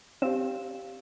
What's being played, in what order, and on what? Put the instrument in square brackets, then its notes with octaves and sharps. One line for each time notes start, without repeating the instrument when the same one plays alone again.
[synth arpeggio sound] C4 [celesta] G4 F5 E7